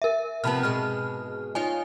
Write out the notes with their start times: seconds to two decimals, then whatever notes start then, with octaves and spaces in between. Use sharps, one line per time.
0.02 A#4 E5
0.44 C3 F3 B3 A5 B5 F6
0.63 G#2 B2 G#3 F6
1.55 D#4 F4 C#5 G#5